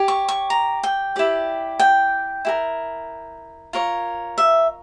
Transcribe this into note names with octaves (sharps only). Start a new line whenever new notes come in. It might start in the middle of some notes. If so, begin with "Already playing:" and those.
Already playing: G4 C#5
C#6
C#6
A#5
G5
E4 G4 D5
G5
E4 G4 A#4
F4 A#4 C#5
E5